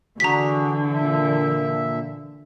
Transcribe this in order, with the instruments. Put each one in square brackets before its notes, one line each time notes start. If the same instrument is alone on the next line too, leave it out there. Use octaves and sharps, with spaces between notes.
[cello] D3 E3 [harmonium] D4 F#4 G#4 [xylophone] A#5 B6
[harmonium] A#2 E5